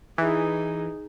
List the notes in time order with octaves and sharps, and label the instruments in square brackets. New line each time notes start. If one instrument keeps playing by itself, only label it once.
[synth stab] E3 [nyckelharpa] D#4 G#4